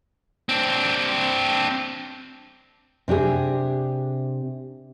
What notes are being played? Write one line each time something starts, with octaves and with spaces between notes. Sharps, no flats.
C4 D4
C3 D4 G4 G#4